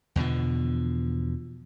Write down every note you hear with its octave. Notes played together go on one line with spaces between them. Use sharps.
E2 B2 D3 F3